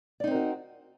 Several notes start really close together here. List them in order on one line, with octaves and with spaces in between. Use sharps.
D5 D#4 C4 A#4 F#4